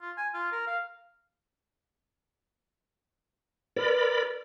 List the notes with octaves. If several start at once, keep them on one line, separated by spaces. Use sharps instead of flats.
F4
G#5
F4
A#4
F5
A#4 B4 D5 B5